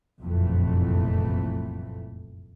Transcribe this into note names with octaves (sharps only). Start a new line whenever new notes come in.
F#1 C2 F2 A#2 E3 A3